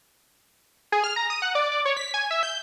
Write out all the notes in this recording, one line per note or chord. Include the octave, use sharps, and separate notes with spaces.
G#4
F6
A#5
D#6
F#5
D5
D5
C#5
B6
G#5
E5
G6